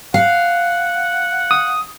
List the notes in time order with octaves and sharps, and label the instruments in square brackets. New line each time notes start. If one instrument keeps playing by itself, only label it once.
[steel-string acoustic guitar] F5 [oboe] F#5
[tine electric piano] D#6